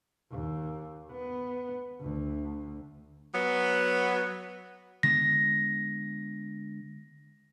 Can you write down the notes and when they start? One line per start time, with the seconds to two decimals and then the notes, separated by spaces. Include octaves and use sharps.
0.31 D#2
1.11 B3
2.01 D2
3.35 F#3 B3
5.03 D3 G#3 B3 A#6